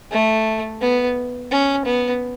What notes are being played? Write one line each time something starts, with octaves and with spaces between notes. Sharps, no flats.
A3
B3
C#4
B3